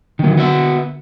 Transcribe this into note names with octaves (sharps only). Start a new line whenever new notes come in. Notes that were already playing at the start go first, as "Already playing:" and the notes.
D3 D#3 F#3 A#3
B3 F#4 E5